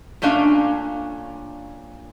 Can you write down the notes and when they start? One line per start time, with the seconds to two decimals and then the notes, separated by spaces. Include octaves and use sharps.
0.22 A#2 A3 C#4 D4 F5